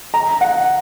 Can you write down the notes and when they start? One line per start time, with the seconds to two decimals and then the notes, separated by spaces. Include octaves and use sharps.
0.14 A#5
0.41 F#5